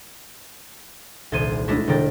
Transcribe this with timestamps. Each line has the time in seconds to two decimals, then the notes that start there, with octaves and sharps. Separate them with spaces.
1.32 D#1 C2 A4 C6 G#6 D#7
1.68 G#3 A3 C#4 D4 E4 F#4
1.87 E1 D3 A#4 G5 A6